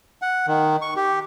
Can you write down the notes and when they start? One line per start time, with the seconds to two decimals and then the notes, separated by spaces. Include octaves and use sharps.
0.22 F#5
0.47 D#3
0.82 C#6
0.96 G4